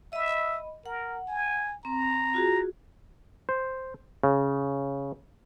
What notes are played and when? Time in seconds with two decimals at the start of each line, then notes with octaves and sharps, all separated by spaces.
0.13 D#5 E5 B5
0.86 A#4 F#5
1.28 G#5
1.85 C4 A#5
2.34 F4 F#4 G#4
3.49 C5
4.24 C#3